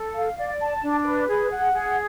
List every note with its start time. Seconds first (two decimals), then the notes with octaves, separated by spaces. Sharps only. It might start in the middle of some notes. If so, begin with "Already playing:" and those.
Already playing: A4
0.14 F5
0.37 D5
0.60 A5
0.83 D4
1.05 B4
1.28 G#4
1.51 F#5
1.73 G#4